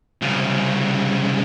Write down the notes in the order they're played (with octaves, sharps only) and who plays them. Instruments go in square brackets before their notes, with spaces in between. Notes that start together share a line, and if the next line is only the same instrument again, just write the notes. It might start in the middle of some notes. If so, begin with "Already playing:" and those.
[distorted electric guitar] C2 C#3